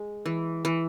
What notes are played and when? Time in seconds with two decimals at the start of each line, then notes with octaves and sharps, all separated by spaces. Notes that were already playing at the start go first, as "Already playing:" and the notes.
Already playing: G#3
0.26 E3
0.65 E3